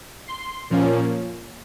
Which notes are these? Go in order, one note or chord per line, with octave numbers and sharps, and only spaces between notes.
C6
A#2 F3 A#3 C#4